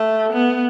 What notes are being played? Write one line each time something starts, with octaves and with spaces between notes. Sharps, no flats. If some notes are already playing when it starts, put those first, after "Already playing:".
Already playing: A3
B3